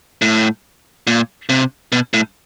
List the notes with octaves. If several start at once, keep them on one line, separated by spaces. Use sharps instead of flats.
A2
A#2
C3
B2
A2